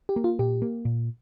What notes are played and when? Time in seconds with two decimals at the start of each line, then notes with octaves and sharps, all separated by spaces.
0.09 G4
0.16 A#3
0.24 F4
0.39 A#2 G4
0.62 A#3
0.85 A#2